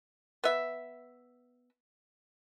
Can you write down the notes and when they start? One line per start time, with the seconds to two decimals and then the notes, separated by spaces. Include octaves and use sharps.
0.44 B3 E5